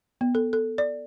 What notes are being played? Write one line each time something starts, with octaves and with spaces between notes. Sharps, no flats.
B3
A4
A4
D5